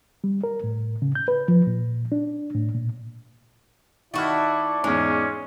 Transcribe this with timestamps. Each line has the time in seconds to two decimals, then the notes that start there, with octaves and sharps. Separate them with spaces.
0.24 G3
0.44 A#4
0.64 A2
1.02 C#3
1.15 G6
1.28 B4
1.48 F3
1.67 A#2
2.12 D4
2.55 A2
2.74 A#2
4.14 D#3 A3 E4 F#4 D5 F6
4.84 E2 G#2 G#3 C#4